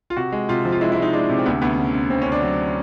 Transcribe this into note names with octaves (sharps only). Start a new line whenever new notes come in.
F4
C3 F#4
G#3
C3 F4
F3
F4
G#3 E4
E4
G#3 D#4
G#3 D4
C3
C4
D2 B3
D2 B3
C#3
C#3
D2 C4
C#4
D2
D4
F#3